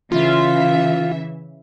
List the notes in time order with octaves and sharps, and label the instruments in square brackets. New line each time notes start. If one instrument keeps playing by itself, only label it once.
[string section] C#3 E3 E5 [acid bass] F4